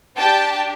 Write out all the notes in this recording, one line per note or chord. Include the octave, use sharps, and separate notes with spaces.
D4 G4 G5 A5